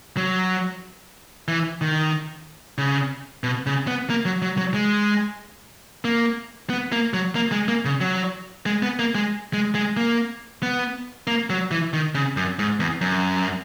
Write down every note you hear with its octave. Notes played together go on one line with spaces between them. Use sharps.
F#3
E3
D#3
C#3
B2
C#3
B3
A#3
F#3
F#3
F#3
G#3
A#3
B3
A#3
F#3
A#3
G#3
A#3
C#3
F#3
G#3
B3
A#3
G#3
G#3
G#3
A#3
B3
A#3
F#3
E3
D#3
C#3
F#2
G#2
E2
F#2